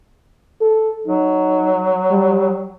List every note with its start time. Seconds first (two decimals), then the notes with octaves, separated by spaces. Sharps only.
0.61 A4
1.06 F#3 D#4
2.10 G3